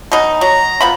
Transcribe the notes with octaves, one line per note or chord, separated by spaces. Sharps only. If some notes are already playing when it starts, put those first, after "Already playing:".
B2 D#4
F#3 A#5
F3 B3 B5